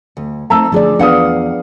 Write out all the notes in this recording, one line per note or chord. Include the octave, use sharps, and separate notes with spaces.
D2
A3 C4 D#4 A5 A#5 E6
D3 F3 D4 G#4 D5
E2 B3 D4 F5 F#5 D#6